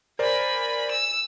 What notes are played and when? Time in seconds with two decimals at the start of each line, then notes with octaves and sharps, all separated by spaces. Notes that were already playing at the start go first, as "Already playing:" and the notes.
0.19 A#4 C5 D5 G#5 B5
0.91 E6